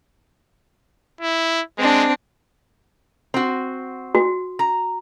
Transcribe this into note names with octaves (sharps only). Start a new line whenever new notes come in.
E4
G#3 C4 D4
C4 F#4
F#4
A#5